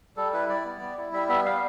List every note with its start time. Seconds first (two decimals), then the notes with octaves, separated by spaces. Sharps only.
0.17 G3 A4
0.33 E4 B4
0.49 G3 D5
0.65 B3
0.81 G3
0.98 E4
1.13 G3 E5
1.29 B3 E5
1.45 G3 F5